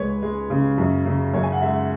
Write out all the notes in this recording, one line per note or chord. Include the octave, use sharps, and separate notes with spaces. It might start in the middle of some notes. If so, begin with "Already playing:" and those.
Already playing: C#2 G#3 B4 C#5
G#3
C#3
F#2
C#3
F#2 C#5
G#5
F#5
G#3 E5